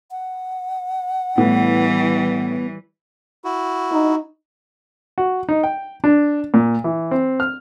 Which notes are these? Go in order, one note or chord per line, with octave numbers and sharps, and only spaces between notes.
F#5
A2 E3 G3 B3
E4 F#4
D#4
F#4
D#4
G5
D4
A#2
E3
C4
F6